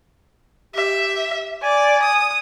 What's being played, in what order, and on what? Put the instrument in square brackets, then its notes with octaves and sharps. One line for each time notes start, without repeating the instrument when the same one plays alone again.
[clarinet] G4 [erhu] E5
[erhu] D5 [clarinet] G#5
[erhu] D#6